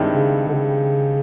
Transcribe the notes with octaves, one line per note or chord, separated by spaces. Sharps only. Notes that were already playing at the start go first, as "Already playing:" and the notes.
Already playing: G2 D#3 G#3 C4 E4
C#3
D3
C#3